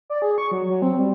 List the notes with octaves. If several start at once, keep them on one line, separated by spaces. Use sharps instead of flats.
D5
G#4
C#6
F#3
F#3
C4
G3